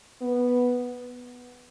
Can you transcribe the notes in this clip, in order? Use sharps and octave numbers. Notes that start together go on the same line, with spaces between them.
B3